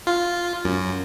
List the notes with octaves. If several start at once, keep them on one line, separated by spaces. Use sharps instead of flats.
F4
F#2